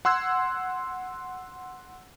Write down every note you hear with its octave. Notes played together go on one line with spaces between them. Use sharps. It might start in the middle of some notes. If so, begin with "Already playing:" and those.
F#5 C6 E6 F#6 G#6